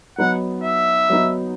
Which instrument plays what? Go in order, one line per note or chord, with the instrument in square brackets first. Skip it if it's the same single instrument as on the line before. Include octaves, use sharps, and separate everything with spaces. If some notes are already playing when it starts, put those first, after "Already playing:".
[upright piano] F#3 B3 D#4 [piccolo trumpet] F#5
[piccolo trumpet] E5
[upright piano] F#3 B3 D#4